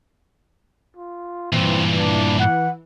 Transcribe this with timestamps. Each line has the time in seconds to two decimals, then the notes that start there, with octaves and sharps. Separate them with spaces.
0.97 F4
1.53 G2 A#2 E3 C4
1.97 D4
2.39 F#5